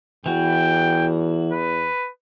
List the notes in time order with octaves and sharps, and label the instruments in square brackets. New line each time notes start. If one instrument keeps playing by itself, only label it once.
[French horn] E2 [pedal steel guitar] E3 F#4 [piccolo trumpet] G5
[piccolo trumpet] B4